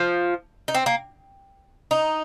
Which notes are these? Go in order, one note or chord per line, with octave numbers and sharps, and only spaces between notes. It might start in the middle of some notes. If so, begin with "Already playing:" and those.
Already playing: F3
D#4
C4
A#3
D#4